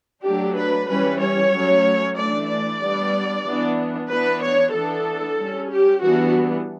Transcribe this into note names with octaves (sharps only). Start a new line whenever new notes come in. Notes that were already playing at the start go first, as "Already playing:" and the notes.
F#3 A3 D4 G4
B4
E3 G3 C#4 B4
C#5
F#3 A3 C#4
E3 A3 D4 D5
D5
G3 B3 D4
E3 B3 D4
E3 B3 D4 B4
C#5
E3 B3 D4 A4
G3 C#4
G4
E3 G3 B3 D4 F#4